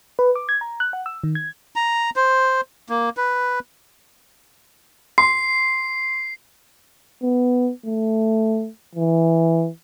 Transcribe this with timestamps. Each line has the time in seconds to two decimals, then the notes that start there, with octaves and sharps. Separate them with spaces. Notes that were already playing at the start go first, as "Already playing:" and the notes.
0.19 B4
0.35 D6
0.49 G#6
0.61 A#5
0.80 F#6
0.93 F#5
1.06 E6
1.24 D#3
1.35 G#6
1.76 A#5
2.16 C5
2.89 A#3
3.17 B4
5.18 C6 C7
7.23 B3
7.86 A3
8.95 E3